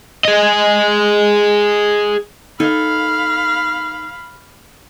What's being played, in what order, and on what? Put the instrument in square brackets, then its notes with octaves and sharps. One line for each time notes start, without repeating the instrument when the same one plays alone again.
[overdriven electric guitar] G#4 D#5
[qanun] D#4 A4 G#5 [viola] F5 B5